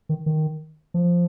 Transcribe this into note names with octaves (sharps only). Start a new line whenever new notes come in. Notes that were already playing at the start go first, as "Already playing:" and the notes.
D#3
D#3
F3